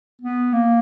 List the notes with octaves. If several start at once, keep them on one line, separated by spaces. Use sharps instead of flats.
B3
A#3